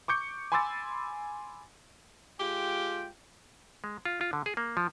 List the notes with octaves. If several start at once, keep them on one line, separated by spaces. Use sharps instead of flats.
C#6 D6 G6 C#7
G#5 B5 C6 D6 E6 A6
G#3 F4 G4 G5
G#3
F4
F4
D3
G#4
A#3
F3